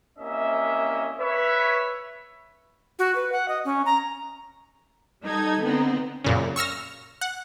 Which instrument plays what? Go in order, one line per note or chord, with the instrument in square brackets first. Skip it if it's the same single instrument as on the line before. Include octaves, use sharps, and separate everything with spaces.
[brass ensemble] C2 A#3 C#4 D#5 E5
B4 C#5 E5
[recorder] F#4
B4
F#5
D#5
C#4
A#5
[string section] G3 D#4 A4 G#6
D3 B3 C4 D#4
[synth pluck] F#2 A#2 C#3
C#6 E6 F6 A#6
F#5